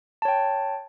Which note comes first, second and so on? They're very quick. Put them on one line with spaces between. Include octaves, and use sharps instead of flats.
A5 C#5 G5